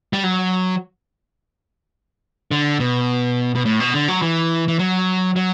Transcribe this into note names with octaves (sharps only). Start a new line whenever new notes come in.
G3
F#3
D3
B2
B2
A2
B2
D3
F#3
E3
E3
F#3
F#3